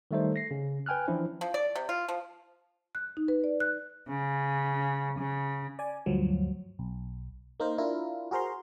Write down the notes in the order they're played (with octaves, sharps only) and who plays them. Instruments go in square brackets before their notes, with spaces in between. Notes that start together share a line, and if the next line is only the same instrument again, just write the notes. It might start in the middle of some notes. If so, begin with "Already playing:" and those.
[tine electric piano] D#3 G3 A3 D#4 C5
A#6 C7
C#3
B4 G5 G#5 F6 F#6
E3 F3 C#4 D4 E4 C5
[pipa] F3
D5
C3
F4
F3
[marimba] F#6
D#4
B4
D5
F#6
[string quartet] C#3
C#3
[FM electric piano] D5 G#5
D2 G2 F3 F#3
B1
A#3 D#4 A#4 C5
D4 E4 F4 A#4
F#4 G#4 A#4 C5 A#5 C6